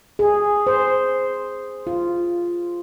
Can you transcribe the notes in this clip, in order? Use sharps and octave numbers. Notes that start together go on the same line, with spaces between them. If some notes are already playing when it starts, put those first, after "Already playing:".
G#4
C5
F4